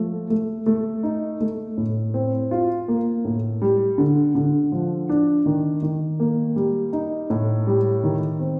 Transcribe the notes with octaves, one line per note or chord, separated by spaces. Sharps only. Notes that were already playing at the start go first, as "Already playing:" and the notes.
Already playing: F3 A3
A3
A3
D#4
A3
A2
C4
F4
A#3
A2
G3
D3
D3
F3
D4
D#3
D#3
A#3
G3
D#4
A2
G3
D#3
C4